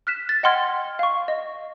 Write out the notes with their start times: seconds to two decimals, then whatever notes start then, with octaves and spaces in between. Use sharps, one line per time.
0.07 F6 F#6 B6 E7
0.29 A6
0.43 D#5 F#5 G5 C6 F6 G#6
0.99 F5 C#6
1.28 D#5